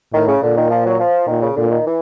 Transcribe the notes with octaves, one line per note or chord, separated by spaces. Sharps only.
A2 D#3
C#3
A#2 D3
D#3
F3
F#3
F3
A#2 D#3
C#3
A#2 D3
D#3
E3